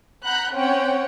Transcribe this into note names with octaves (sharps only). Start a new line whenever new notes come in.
F#5 A#5 B5 F#6 G6
C4 C#4 C#5 F#5 G5